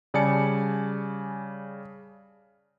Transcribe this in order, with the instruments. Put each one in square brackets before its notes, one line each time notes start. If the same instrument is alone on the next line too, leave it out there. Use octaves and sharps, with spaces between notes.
[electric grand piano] C#3 G3 D5 G#5 A5 C#7